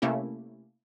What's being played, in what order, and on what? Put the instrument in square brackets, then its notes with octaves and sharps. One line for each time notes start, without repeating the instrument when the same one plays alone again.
[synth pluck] C3 A3 A#3 C#4 E4 G4